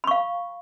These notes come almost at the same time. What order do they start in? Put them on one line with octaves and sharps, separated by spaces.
B5 C#6 F5